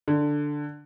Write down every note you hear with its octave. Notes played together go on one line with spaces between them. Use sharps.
D3